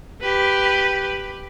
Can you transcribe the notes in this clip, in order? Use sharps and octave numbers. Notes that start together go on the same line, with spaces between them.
G4 B4